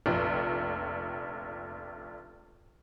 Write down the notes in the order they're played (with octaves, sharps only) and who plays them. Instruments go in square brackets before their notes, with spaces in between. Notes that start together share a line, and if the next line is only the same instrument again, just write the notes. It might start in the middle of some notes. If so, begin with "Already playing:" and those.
[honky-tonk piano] F1 A#1